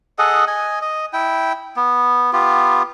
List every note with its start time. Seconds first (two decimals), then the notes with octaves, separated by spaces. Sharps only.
0.19 G#4 A4 D#5 F#5
0.47 D#5 G#5
0.82 D#5
1.13 E4 G5
1.76 B3
2.33 B3 F4 G4